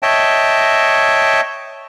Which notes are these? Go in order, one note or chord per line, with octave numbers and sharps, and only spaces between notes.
C#5 D#5 E5 G5 A5